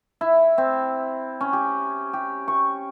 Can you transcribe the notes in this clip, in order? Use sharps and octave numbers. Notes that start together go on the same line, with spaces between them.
E4
C4
C#4
G4
G4
C#6